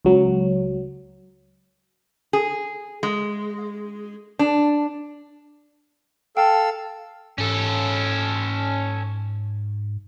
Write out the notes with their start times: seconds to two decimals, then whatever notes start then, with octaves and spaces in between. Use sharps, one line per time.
0.05 C#2 F#3
2.33 G#4
3.03 G#3
4.39 D4
6.37 A4 F5 G5 A5 E6
7.38 G#2 C#4 A4